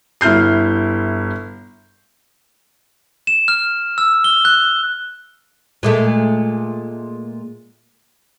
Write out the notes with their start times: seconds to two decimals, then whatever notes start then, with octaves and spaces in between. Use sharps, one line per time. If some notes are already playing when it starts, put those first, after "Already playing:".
0.21 G1 E4 F6 G6 C7
3.27 E7
3.48 F6
3.98 E6
4.24 G7
4.45 F#6
5.83 A#2 G#3 A3